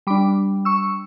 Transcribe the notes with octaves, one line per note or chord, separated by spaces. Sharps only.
G3 D4 B5 D6
C#6 E6